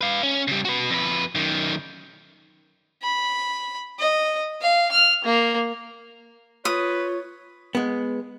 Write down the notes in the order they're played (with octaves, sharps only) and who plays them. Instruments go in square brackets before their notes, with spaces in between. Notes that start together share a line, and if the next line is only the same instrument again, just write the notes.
[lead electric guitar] B4 F5
C#4
C#3 G3
F#4 B4
F2 B4
F#2 D#3
[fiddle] B5
D#5
F5
F6
A#3
[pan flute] F4 [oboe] B4 [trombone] C#5 [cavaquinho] D#6
[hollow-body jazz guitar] G#3 B3